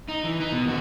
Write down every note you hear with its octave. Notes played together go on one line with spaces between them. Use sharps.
D#4
E3
D#4
B2
D#2 F#4